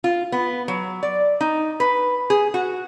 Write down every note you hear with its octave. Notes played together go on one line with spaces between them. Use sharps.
F4
B3
F#3
D5
D#4
B4
G#4
F#4